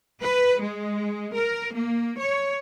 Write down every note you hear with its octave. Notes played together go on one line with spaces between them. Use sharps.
B4
G#3
A#4
A#3
C#5